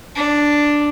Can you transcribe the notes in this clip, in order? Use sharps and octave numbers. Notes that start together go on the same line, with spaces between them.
D4